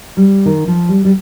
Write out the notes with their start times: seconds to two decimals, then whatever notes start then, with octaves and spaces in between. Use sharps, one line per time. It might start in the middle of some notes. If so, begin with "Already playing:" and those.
0.17 G3
0.46 D#3
0.67 F3
0.89 G3
1.05 G3